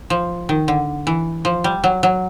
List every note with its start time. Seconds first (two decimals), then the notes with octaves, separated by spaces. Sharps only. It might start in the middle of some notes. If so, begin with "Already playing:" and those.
0.10 F3
0.49 D#3
0.68 D3
1.07 E3
1.45 F3
1.64 G3
1.84 F#3
2.03 F#3